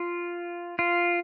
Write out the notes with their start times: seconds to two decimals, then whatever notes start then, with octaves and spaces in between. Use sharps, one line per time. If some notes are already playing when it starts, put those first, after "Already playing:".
Already playing: F4
0.79 F4